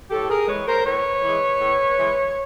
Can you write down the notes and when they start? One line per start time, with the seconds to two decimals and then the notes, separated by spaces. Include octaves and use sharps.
0.11 A2 G4 A4
0.30 G#4 A#4
0.48 E3 G#3 B4 C#5
0.67 A#4 C5
0.85 A2 B4 C#5
1.23 E3 G#3
1.60 A2
1.97 E3 G#3